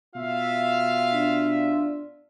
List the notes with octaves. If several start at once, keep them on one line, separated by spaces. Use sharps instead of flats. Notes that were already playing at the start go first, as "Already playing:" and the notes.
B2 F4 E5 F5
D4